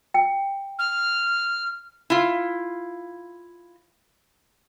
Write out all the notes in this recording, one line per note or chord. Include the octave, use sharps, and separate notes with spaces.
G5
F6
E4 F4